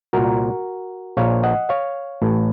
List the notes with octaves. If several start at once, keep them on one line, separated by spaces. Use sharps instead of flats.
C2 A#2 F#4 A#4
A#1 A#2 C#5 F5
D#5 F#5
C#5 F5
A1 A2